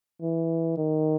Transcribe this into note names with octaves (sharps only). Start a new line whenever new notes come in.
E3
D#3